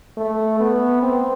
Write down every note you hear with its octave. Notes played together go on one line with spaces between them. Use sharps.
A3
B3
C4